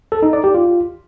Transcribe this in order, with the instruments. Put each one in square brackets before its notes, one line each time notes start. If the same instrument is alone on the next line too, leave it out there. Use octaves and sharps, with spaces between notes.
[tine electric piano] A4
D#4
D5
G4
F4